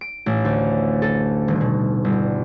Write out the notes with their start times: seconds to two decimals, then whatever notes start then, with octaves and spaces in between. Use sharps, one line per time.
0.01 D7
0.26 A1
0.45 D2
1.02 A4
1.48 D#1
1.61 B2
2.05 G1